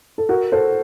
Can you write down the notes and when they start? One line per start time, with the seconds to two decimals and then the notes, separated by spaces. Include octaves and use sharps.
0.18 A4
0.29 F#4 A#4
0.52 A4 C5